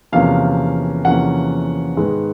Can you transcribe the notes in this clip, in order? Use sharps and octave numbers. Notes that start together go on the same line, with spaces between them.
E2 C3 F3 A#3 C#4 F5
E2 C3 F3 A#3 C#4 F#5
G#2 D#3 G#3 B3